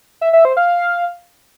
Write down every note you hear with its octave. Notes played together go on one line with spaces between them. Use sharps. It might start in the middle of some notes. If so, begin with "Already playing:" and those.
E5
E5
C5
F5